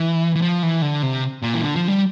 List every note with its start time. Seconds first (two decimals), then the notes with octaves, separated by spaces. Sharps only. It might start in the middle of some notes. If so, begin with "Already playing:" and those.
Already playing: E3
0.36 E3
0.42 F3
0.63 E3
0.82 D3
1.02 C3
1.42 A#2
1.54 E3
1.63 D3
1.76 F3
1.88 G3